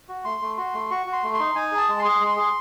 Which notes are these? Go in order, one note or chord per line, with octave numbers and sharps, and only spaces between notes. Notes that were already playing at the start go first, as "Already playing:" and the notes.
F#4
A3 C6
A3
F#4 C6
A3
F#4 C#6
F#4
C6
A3
C6
D#4
D#4 G#5
G#4
A5
G#3
C6
G#4
G#3
G#4